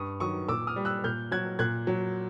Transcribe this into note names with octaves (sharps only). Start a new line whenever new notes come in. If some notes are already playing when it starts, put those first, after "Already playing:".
Already playing: G2 C#6 D#6
D#3 F#3 C#6 D#6
A#2 D6 E6
D#6 F6
G3
E6 F#6
A#2 F6 G6
F#3 F#6 G#6
A#2 F#6 G#6
F#3